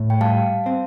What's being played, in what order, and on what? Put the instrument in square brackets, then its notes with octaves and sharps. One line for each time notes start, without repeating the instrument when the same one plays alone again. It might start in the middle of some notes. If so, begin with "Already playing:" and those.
Already playing: [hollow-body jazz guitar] A2
[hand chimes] G5
[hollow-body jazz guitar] G3 [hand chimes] F5 A5
[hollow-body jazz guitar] C4